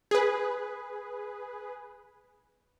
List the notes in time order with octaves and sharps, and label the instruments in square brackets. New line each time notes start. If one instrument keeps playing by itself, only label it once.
[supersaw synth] G#4 B4